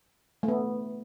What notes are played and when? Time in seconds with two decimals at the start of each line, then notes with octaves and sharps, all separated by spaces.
0.43 A3
0.48 B3